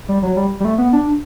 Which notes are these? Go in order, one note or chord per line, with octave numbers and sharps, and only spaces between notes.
G3
F#3
G3
G3
A3
B3
D4